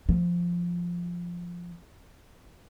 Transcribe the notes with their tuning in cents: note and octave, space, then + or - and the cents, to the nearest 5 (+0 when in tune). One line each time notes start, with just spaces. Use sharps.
F3 -5